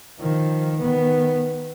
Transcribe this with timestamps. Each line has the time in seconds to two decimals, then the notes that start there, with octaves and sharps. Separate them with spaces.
0.20 D#3 F3
0.79 D#3 B3